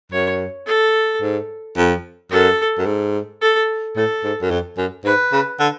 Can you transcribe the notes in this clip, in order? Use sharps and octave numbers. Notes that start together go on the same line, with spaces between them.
F#2 C#5
A4
G#2
F2
F#2 A4
F#2
G#2
A4
A2 A4
G#2
F#2
F2
F#2
G#2 B4
C#3
D3